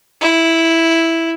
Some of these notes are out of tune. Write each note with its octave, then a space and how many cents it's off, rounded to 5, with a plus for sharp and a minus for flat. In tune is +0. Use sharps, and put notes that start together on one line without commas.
E4 -5